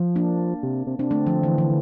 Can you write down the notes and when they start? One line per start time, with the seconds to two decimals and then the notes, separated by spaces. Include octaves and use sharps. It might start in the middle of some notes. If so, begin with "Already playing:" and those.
Already playing: F3
0.16 A#3 D4
0.63 C3
0.87 C3
0.99 C3 D4
1.11 D3 A3 C4
1.27 F3
1.43 E3
1.58 E3